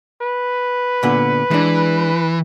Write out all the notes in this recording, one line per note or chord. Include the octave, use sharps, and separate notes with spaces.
B4
A#2 D3 B3
E3 G#3 D4